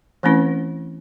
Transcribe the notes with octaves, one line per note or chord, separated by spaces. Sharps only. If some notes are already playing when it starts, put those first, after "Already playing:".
E3 A3 C4 C#4 E4 B4